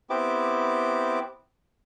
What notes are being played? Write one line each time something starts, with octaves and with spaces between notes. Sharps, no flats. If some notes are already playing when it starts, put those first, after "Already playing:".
B3 C4 E4 G4 D6